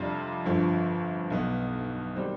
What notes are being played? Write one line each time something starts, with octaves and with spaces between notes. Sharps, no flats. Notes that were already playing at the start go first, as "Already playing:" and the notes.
Already playing: F2 C3 G3 D4 F4
G1 F2 D3 F3
B1 B2 B3
D#3 G3 C4